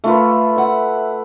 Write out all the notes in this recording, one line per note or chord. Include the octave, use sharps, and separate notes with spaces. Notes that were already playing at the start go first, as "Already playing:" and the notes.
A3 F4 B4
E5 F#5